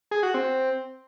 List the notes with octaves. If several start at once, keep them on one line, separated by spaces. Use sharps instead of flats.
G#4
F#4
C4